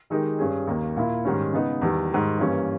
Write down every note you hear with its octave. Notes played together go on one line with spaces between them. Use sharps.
D#3 G#3 D#4 G4 A#4
G2 G3 C#4 G#4
D#2 D#3 A#3
A#2 A#3 E4
G#2 D#3 G3 C#4
C#3 G#3 B3 D#4
E2 D#3 G3
G#2 D#3 G3
G2 E3 G3 A#3 C#4